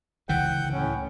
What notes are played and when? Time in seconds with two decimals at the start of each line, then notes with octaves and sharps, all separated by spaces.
0.29 C#2 D3 E3 F#5 G5 G6
0.73 A2 C#4